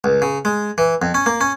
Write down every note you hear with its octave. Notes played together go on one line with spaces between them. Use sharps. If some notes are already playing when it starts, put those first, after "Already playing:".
C#2
C#3
G#3
E3
F2
C#4
A#3
C#4